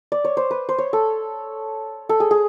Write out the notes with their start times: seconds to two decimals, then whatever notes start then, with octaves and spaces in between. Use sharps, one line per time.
0.12 D5
0.25 C#5
0.37 C5
0.51 B4
0.69 C5
0.79 C#5
0.93 A4
2.09 A4
2.20 G#4
2.31 G#4